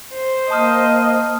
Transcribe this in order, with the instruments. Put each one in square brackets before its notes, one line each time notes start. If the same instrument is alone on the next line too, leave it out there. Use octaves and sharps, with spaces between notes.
[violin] C5
[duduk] A#3 [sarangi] D#5 [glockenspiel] A5 D#6 F6